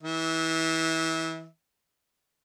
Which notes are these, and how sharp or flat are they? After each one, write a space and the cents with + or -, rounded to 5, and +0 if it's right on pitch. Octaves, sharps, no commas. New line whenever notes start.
E3 -25 E5 -35